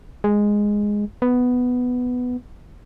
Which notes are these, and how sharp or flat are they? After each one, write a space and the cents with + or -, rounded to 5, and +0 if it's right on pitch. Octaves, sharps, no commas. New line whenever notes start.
G#3 -5
B3 +5